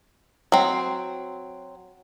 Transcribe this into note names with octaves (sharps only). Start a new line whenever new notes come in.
F#3 C4